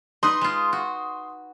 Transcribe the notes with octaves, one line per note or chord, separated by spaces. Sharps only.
D#4 B4 C6 D#6
G#3 F4
F#4